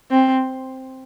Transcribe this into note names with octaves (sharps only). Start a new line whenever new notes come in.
C4